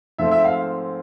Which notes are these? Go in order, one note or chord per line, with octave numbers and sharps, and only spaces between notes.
G#2 F3 A3 C4 E5
E5
F5